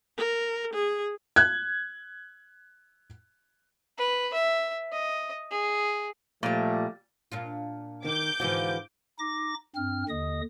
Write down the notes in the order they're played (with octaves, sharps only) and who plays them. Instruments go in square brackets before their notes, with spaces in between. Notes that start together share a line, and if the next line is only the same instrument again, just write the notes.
[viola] A#4
G#4
[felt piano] F#6 G#6
[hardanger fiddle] B4
E5
D#5
G#4
[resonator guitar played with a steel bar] A#2 G3 [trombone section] F3 A3
[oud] A#2 D4 F4
[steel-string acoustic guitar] D#3 [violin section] D6 G6
[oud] G#2 D3 F3 [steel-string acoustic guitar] E3 F#4
[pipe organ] D#4 D6 A#6
G2 C4 F6
D#2 D3 D#5 D#6